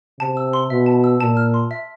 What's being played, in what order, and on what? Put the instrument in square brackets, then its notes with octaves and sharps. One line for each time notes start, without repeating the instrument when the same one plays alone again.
[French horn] C3 [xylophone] A5
[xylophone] E6
C6
[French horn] B2 [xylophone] E5
[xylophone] A5
E6
[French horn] A#2 [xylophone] A5
[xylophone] F6
C6
E5